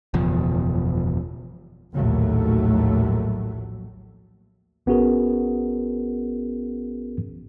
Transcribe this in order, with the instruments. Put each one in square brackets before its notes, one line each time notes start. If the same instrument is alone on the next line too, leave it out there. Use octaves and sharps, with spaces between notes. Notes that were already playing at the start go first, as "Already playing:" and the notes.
[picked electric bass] F#1 E2 B2 F3
[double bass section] A#1 D#2 A2 F#3 A3
[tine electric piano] A1 B3 C#4 F#4 G#4 A#4